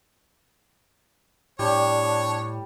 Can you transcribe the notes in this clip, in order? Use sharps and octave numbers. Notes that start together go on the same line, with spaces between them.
A2 G3 D4 C#5